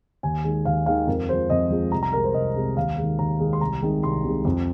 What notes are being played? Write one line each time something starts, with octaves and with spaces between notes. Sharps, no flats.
D#2 G#5
D#3 G#3
D#2 F5
D#3 G#3 F5
F2 A#4
F3 G#3 C5
F2 D#5
F3 G#3
C2 A#5
A#5
C3 G#3 A#4
C5
C2 D#5
C3 G#3
D#2 F5
D#3 G#3
D#2 A#5
D#3 G#3
C6
C2 A#5
C3 D#3 G#3
C2 C6
C3 D#3 G#3
F2